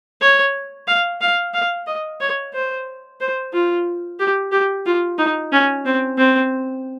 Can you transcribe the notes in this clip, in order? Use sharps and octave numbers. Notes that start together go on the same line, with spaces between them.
C#5
F5
F5
F5
D#5
C#5
C5
C5
F4
G4
G4
F4
D#4
C#4
C4
C4